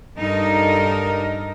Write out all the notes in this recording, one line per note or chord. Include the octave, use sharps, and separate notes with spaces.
G2 D#4 A4 A#4